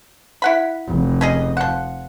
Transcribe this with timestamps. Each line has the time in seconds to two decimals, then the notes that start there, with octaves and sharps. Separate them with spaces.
0.42 E4 F#5 B5
0.88 F1
1.21 C#4 G#4 D#5
1.57 F3 F#5